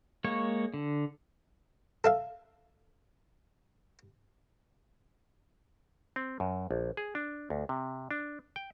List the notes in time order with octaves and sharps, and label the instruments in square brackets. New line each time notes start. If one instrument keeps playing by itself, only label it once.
[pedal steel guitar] G#3 A#3 C#5 C#6
D3
[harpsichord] A4 E5 F5
[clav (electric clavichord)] C4
F#2
A#1
G#4
D4
D2
C3
D4
G5